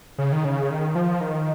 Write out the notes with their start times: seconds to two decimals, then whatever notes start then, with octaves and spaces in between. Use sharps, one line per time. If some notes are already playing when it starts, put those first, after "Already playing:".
0.18 C#3
0.32 D#3
0.45 C#3
0.70 D#3
0.95 F3
1.21 D#3